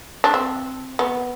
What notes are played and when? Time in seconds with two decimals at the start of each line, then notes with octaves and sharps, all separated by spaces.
0.24 D4
0.34 C4
0.99 B3